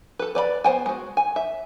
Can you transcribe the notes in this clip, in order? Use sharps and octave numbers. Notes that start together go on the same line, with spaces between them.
A4 B4
B4 D5 E5 B5
B3 C5 G5 G#5
G#3 F#4
G#5
E5